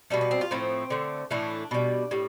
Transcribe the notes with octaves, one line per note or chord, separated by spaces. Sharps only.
B2 G3 A3
B3
C4
F4
A2 F3 A3 C4
D3 A3
A2 E3 A3 D4
B2 G3
A2 G3